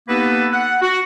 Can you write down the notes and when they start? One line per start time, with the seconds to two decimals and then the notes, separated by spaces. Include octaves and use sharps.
0.09 A#3 B3 D#4 G4 A4 B4
0.53 F#5
0.82 F#4